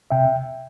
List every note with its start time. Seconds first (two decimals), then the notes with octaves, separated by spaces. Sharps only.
0.10 C3 E5 G5